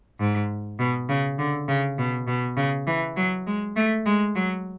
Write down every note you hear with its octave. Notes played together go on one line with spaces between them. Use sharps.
G#2
B2
C#3
D3
C#3
B2
B2
C#3
E3
F#3
G#3
A3
G#3
F#3